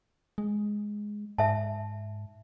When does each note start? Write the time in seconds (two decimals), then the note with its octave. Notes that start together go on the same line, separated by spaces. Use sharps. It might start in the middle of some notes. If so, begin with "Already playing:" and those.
0.38 G#3
1.38 G#2 E5 A5